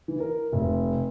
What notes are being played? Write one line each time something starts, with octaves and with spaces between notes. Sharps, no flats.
E3
A#4
F1